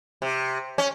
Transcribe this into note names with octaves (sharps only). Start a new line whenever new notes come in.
C3
C#4